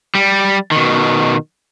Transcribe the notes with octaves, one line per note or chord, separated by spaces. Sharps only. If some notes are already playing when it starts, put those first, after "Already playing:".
G3
B2 D#3